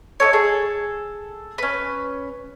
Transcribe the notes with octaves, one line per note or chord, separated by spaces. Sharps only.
D#4 G4 A4 C#5
G#4 A4
C#4 B4